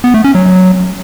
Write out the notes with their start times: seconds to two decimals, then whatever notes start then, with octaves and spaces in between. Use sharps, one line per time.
0.04 B3
0.14 A3
0.24 C#4
0.35 F#3